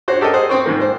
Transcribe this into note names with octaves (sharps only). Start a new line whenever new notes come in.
D4 F#4 C5 C#5
G4 A4 A#4 D#5
G#4 C5 F#5
C4 C5 C#6
G#2 D#3 A#3
C5